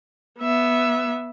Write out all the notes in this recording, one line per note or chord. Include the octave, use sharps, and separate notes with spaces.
B3 E5